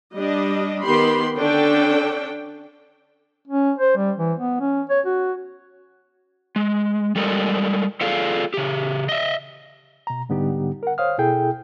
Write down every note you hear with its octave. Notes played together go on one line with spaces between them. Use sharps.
G3 D4 D#5
D#3 B3 G4 B5 C6
D3 C#4 D4 A4 G5
C#4
C5
G3
E3
B3
C#4
C#5
F#4
G#3
G3 G#3 A4 A#4 D5 D#5
F4 G#4 A4 D5 F5
C#3 G4
D#5 E5
B2 A#5
G#2 D3 G3 B3 D#4 G4
A#4 F#5
C5 C#5 F5 D#6 F6
B2 E4 G#4 A4 G5 G6